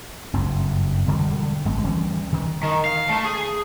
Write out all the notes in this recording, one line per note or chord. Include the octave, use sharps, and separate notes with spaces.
F#1 G2 C4
E1 D3 G3 G#3
G#1 G#3 A3 C4
D2 E3 G3 C#4
D#3 E3
D#3
F5
A3
G#4